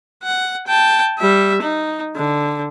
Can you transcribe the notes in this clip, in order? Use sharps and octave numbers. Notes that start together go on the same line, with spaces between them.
F#5
G5 A5
G3 E5
D#4
D3